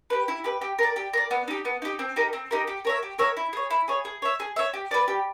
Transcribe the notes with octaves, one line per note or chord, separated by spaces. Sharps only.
G4 B4
E4
G4 B4
G4
A#4 D5
G4
A#4 D5
B3
D#4 G4
B3
D#4 G4
C4
D#4 G4 A#4
C4
D#4 G4 A#4
G4
A#4 C#5 E5
G4
A#4 C#5 E5
E4
G#4 C#5
E4
G#4 C#5
G#4
C#5 E5
G#4
C#5 E5
G4
B4 D5
G4